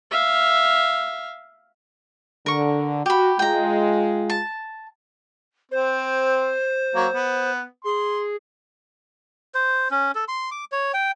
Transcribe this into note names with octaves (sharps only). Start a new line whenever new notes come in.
E5 F5
D3 A#4 C#6
F#4 G4 B5
G#3 F4 G5 A#5
A5
C4 C5
F#3 A#3
B3
G#4 C6
C5
C#4
A4
C6
D6
C#5
G5